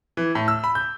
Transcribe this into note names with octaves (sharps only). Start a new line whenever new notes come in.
E3
A2
E6
B5
G6